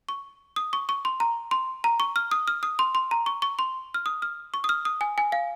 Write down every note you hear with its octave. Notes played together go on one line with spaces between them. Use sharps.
C#6
D#6
C#6
C#6
C6
A#5
C6
A#5
C#6
F6
D#6
F6
D#6
C6
C6
A#5
C#6
C#6
C6
F6
D#6
F6
C#6
D#6
F6
D#6
G#5
G#5
F5